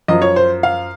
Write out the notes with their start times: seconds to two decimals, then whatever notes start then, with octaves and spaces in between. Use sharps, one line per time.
0.08 F#2 F3 D#5
0.22 C#5
0.36 C5
0.63 F5